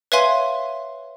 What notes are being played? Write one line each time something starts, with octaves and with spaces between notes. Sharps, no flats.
B4 C#5 E5 F5 G#5 C6